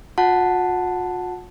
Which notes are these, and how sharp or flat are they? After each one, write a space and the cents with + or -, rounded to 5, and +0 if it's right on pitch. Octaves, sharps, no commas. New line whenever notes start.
F4 +45 F#5 +0 A5 +0